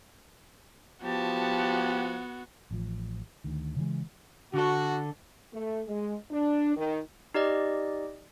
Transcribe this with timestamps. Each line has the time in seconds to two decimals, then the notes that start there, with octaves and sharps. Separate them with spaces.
1.03 F3 B3 F#4 G4 A5
2.71 A1 F3
3.44 D2 D#3
3.76 C#3 E3 G#3
4.54 D3 F#4 A4
5.53 A3
5.88 G#3
6.31 D4
6.76 D#3
7.34 D#4 G4 D5 D#5